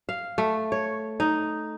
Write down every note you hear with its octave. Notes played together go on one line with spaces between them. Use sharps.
F5
A3
C#5
D#4